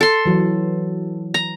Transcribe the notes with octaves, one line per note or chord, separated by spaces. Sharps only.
A4 C6
E3 F#3
A#5